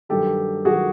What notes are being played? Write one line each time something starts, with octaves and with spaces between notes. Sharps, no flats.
G2 D#3 F#3 G4 A4
D#3 F#3 F#4 G#4